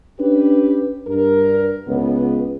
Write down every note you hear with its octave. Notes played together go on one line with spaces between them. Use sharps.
C#4 D4 G4 B4
G2 A#4
C#2 B3